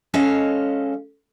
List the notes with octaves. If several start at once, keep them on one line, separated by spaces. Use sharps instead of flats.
G#3 C#4 A4 C#5 D#5 F5